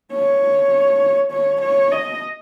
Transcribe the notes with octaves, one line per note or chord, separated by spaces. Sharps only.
C#5
C#5
C#5
D#5